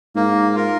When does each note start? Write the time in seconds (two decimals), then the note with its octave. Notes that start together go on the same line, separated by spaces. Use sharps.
0.15 G#2 A#3
0.55 F4 A#4